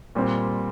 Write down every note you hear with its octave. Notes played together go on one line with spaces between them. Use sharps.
A#2 G3 C4